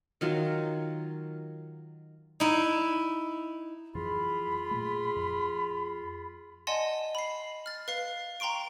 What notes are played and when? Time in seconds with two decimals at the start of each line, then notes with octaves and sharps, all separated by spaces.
0.21 D#3 F#3 F4
2.40 D#4 E4
3.95 F2 E3 F#3 F4 G#4 B5
4.71 A#2 A3
5.16 F2
6.67 D5 D#5 F#5 G#5 A5 C6
7.15 B5 C7
7.66 F6 A6
7.88 B4 F5 C7
8.40 G5 A#5 C6 C#6 D7